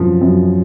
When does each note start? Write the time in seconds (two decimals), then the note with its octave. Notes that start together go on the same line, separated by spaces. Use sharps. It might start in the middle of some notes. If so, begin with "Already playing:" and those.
Already playing: F#2 F3
0.21 F#2